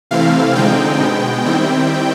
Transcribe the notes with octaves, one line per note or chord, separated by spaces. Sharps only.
C3 E3 A3 C4 E4 F5
D3 F3 G#3 C4 D#4 G5
B2 G#3 B3
D#3 G3 C4 E4